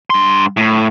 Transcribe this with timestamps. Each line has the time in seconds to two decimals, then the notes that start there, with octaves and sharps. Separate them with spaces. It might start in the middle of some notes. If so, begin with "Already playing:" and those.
0.10 G2 C6
0.57 A2